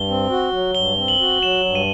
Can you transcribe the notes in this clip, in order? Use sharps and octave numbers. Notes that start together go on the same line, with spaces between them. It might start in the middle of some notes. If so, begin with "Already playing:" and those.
Already playing: G2 G7
C4
F#4
F#3
G2 G7
C4
F#7
F#4
F#3 E7
G2
D#7